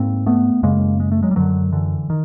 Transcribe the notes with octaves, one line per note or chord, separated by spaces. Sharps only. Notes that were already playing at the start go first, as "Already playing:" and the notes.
Already playing: G#2 A#3 C4
A3 B3
F#2 C#3 G#3 A#3
G#3
A3
F#3 G#3
G3
F#2 D3 E3 F#3
D3 E3
D#3